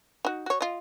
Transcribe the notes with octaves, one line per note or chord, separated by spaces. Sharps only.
D#4 F#4
F#4 C#5
F4 D#5